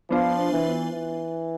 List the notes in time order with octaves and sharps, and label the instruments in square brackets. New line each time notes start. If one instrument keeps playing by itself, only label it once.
[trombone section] F3 [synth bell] B3 D4 F4 C5
[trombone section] E3
E3